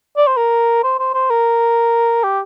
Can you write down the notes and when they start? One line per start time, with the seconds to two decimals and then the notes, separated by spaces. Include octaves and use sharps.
0.17 D5
0.27 C5
0.37 A#4
0.83 C5
0.99 C5
1.14 C5
1.30 A#4
2.24 G4